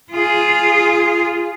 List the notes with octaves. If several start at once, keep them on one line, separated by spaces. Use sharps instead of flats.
F4 G#4